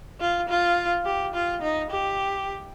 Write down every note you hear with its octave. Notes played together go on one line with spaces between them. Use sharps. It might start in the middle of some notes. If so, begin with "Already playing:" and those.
F4
F4
G4
F4
D#4
G4